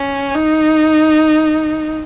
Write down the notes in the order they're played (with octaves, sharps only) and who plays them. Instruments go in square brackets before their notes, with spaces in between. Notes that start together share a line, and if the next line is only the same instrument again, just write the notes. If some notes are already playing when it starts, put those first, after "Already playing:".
Already playing: [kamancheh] C#4
D#4